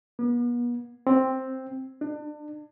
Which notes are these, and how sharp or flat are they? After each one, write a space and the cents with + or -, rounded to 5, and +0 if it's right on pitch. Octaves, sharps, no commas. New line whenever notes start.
B3 -40
C4 +5
D4 +30